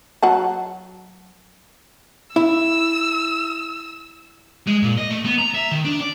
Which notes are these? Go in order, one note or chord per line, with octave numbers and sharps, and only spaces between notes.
F#3 F#5 A5
E4 E6
G#3
A#2
D#5
A3
B3
A#5
E5
D#3
D4
D5